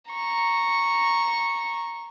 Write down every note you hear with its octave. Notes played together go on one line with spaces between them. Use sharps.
A#5 C#6